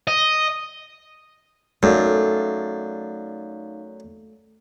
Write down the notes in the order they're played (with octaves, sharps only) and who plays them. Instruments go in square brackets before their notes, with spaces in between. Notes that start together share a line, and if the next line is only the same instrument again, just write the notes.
[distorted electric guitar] D#5
[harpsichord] F#2 [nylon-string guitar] A3 [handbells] D#4 D5 F5